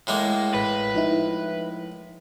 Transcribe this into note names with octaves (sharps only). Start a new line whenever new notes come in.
A2 G#3 A#3
A1 B4
F3 D#4 E4